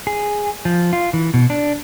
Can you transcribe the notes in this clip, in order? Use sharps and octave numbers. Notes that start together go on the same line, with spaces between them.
G#4
F3
F4
E3
B2
D4